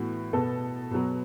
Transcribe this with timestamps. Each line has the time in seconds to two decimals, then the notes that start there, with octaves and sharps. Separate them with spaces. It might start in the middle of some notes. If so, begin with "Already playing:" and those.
Already playing: A2 E3 B3 F#4
0.33 B2 B3 A4
0.91 B2 F#3 B3